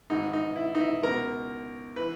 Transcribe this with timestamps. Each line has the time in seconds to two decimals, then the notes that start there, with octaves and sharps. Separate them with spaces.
0.10 G#1 G#2 D#3 D#4
0.33 D#4
0.56 E4
0.75 D#4
0.80 E4
1.03 C#2 B2 A#4
1.96 E3 B4